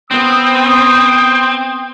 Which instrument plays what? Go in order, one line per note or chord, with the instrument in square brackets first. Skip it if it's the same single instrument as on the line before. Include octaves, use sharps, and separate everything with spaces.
[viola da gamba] B3 [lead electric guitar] C4 [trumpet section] D#6